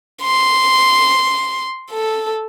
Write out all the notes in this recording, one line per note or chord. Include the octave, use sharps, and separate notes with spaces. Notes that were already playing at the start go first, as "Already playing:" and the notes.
C6
A4